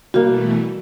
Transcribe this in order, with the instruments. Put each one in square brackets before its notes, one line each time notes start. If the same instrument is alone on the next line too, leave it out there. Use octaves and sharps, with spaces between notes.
[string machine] B2 E3 A3 [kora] G3 A#3 [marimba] F#4